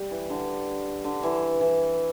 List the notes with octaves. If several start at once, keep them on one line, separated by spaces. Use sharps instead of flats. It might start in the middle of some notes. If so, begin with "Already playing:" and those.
Already playing: G3
E3
D3
D3
E3
E3